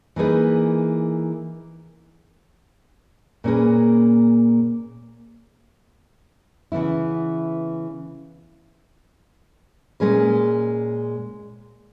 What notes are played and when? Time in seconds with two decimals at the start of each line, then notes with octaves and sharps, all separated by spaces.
0.16 E3 A#3 D#4 G#4 B4
3.44 A#2 A#3 C#4 G#4 B4
6.72 C#3 E3 B3 E4
10.00 A#2 G#3 C#4 G#4 B4